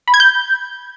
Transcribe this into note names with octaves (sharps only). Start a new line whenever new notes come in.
B5
G#6
G6